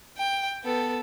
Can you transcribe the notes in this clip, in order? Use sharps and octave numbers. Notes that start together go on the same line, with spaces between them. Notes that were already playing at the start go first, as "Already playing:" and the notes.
G5
B3 A4